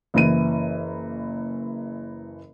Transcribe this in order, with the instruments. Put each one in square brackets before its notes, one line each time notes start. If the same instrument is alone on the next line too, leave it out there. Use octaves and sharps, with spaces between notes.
[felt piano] F#1 E3 D#7